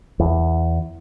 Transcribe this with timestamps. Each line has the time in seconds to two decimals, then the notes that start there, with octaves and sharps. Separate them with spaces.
0.19 E2